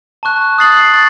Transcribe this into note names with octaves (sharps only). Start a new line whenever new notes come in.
A5 C#6 F#6
D#6 F#6 A6 C7 F#7
C#6 A6